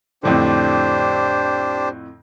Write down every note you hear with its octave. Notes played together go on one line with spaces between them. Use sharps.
F2 A2 D3 D4 G4 C5